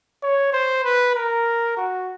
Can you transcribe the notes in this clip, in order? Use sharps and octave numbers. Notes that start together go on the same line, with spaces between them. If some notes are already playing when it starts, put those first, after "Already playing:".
C#5
C5
B4
A#4
F#4